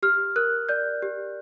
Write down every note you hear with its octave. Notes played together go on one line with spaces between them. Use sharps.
G4 F6
A#4 F#6
D5 G6
G4